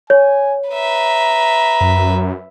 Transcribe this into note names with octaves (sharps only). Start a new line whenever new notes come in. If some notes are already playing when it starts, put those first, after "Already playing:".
C#5 G#5
B4 E5 A#5
F#2